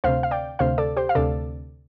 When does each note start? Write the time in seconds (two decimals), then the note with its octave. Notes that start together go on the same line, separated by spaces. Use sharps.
0.04 D2 C3 C5 F5
0.23 F5
0.31 D5 G5
0.59 D2 C3 C5 F5
0.78 A4 D5
0.97 G4 C5
1.09 F5
1.15 D2 C3 A4 D5